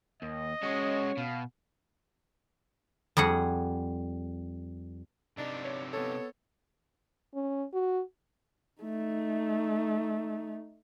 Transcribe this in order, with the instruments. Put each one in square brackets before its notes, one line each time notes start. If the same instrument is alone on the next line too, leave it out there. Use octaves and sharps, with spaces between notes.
[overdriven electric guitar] D#2 [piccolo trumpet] D#5
[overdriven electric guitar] G#3 F#4 [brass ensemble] C#4 C#5
[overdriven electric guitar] B2 [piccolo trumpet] F5
[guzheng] F2 G3 G#4 F#5
[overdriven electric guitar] C3 D#4 [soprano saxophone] D4
[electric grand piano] C#5
[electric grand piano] B3 A4 [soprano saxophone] C#5
[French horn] C#4
F#4
[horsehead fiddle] A3 D#4